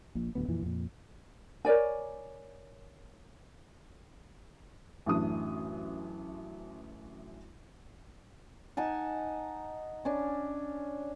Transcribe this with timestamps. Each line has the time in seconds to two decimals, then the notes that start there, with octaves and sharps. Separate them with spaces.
0.15 A#1 A#2
0.35 D1 D2 B3
0.48 F2 A#2 E3
0.62 F2 A#2
1.65 A#4 C#5 D5 G#5
5.06 A1 F#2 A3 D4 D#6
8.77 D#4 F#5 G#5 A5
10.05 C#4 D4